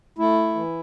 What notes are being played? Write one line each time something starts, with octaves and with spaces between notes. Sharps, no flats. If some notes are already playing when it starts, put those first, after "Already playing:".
A3 E4
E3